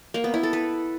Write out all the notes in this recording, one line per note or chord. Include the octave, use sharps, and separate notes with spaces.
A#3
B3
E4
A4
B4